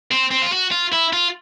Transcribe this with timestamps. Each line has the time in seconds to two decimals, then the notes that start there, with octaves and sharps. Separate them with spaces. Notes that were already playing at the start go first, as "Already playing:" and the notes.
0.11 C4
0.31 C4
0.42 F4
0.53 F#4
0.72 F4
0.93 E4
1.13 F4